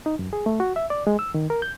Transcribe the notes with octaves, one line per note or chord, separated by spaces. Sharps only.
D#4
F#2
G#4
A3
F#4
E5
D5
G#3
E6
D#3
A#4
G6